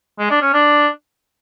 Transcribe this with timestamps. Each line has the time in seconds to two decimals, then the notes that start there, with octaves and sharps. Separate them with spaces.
0.19 G#3
0.30 D4
0.42 C#4
0.53 D4